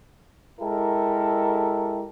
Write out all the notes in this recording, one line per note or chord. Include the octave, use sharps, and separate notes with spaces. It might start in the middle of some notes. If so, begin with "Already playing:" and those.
G#3 E4 G4 A4 A#4